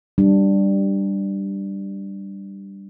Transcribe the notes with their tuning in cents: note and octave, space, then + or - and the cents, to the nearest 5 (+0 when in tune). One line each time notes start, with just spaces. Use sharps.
G3 +0 D4 +10